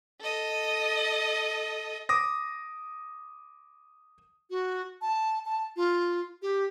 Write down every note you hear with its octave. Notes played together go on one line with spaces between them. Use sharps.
A4 D#5
D6 D#6 A#6
F#4
A5
A5
F4
G4